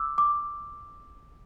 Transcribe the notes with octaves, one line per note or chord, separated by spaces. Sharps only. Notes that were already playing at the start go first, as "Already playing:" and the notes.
Already playing: D6 E6
D6